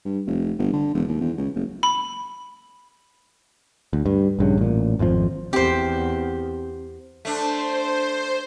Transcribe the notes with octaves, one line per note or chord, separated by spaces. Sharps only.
G2
F1
G1
D3
E1
D#2
E2
C#2
F#1
B5
D2
G2
A#1 G2 C#3
A1 A#2
G#1 F2 A#2 F3
E2 C4 G4 C5
A3 D4 C5